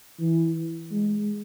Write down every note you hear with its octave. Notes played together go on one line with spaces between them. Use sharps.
E3
G#3